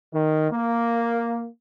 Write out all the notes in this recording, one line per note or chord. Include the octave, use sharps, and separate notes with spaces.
D#3
A#3